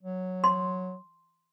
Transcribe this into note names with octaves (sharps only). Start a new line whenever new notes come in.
F#3
C6